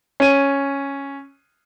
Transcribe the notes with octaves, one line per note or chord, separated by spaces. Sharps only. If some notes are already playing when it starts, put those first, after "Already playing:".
C#4 D#7